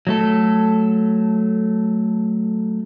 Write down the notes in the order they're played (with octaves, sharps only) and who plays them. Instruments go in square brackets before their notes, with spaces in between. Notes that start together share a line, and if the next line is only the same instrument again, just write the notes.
[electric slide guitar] F#3 A3 A4